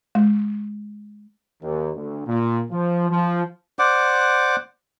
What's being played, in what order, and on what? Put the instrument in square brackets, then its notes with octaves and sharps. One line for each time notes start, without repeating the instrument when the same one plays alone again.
[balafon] G#3
[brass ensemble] D#2
D2
A#2
F3
F3
[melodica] C5 D5 F#5 D6